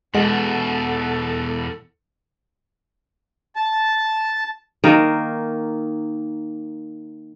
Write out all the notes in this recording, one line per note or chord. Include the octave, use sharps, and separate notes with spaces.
E2 B2 G#3 A4 F#5
A5
D#3 A#3